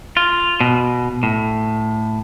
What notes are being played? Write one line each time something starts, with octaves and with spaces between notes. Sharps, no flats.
F4
B2
A2